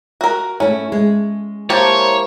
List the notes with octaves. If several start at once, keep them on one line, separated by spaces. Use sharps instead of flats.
F#4 A#4
A3 C#4 E4
G#3
A#3 E4 G4 A#4 C5 C#5 A5